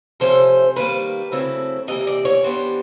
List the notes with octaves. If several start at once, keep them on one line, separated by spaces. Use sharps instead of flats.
C3 F3 A3 C#4 C5
D#3 G3 A#3 B4
C#3 F#3 A3 C4 E4
C3 E3 G3 A#3 D#5
D5
C#5
E3 G3 B3 D4 C5